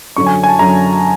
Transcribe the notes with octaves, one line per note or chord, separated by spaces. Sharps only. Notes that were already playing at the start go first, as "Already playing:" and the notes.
F#2 D3 F#3 C#6
G#5
G#5
A5
F#2 D3 F#3 A#5